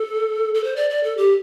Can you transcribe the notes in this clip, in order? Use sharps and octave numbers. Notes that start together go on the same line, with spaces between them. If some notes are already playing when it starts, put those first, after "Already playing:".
Already playing: A4
A4
C5
D5
D5
A4
G4